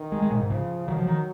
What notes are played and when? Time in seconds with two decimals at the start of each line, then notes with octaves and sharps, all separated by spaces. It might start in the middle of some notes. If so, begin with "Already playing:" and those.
Already playing: D#3
0.12 G#3
0.22 G#3
0.31 A#2
0.41 G#2
0.50 C#3 F3
0.87 D#3 F#3
0.97 F3
1.07 D#3